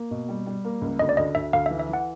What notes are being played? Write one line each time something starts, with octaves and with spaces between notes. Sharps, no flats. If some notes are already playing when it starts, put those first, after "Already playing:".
Already playing: A#3
B2
G3
G3
A#3
C#2
D2 D#5
D5
D2 D#5
D2 E5
D2 F5
E5
E3
E5
E3 F#5